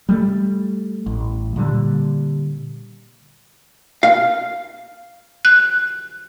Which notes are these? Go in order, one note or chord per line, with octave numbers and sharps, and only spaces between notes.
G3 A3
A1
A#2 D3 G3
F5
F#6